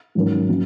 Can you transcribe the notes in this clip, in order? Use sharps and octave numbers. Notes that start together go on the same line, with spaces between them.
G#2 D#3 F#3 C#4 A#4
F#3 A#3 C#4